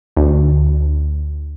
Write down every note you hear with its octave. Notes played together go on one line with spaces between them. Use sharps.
D2